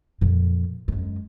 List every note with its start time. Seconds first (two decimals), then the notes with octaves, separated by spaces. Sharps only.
0.21 F2 A#2
0.88 F#2 G#3